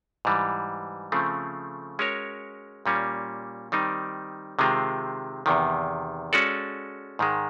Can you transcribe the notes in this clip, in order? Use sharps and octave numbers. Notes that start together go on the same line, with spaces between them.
G#2 E3 G3
C#3 F3 A3 C4
G#3 C#4 F#4 A#4 C#5
A#2 G3 A#3 C#4
D#3 G3 C4 D#4
C3 D#3 G#3 C4 F4
E2 C3 D#3
G#3 C#4 F#4 A4 D5
G#2 D#3 G#3